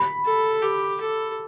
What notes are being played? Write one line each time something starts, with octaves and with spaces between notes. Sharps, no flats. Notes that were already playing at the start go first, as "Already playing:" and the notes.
Already playing: B5
A4
G4
A4